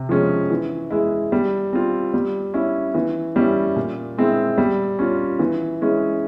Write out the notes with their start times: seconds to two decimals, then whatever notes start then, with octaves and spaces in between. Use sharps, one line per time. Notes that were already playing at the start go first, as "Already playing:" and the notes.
Already playing: C3
0.09 F3 G#3 C#4
0.50 E3
0.91 G#3 E4
1.32 G3
1.73 C4 F4
2.14 G3
2.54 C#4 E4
2.94 E3
3.36 G3 C#4 E4
3.76 A#2
4.18 G#3 C4 E4
4.58 G3
4.99 C#4 F4
5.39 E3
5.81 G#3 C#4 E4